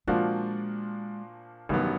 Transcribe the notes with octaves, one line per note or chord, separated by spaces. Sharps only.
A#2 F3 G#3 A#3 D4 F#4
A1 G2 D#3 F#3 G3 B3